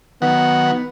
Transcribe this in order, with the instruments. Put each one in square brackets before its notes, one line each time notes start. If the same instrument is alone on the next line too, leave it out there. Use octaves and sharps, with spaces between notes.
[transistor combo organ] D#3 F#3 F#5 [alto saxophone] B3